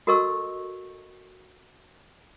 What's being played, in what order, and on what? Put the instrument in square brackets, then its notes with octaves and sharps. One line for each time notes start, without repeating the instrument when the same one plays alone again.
[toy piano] F#4 A4 A#4 D#5 C#6 E6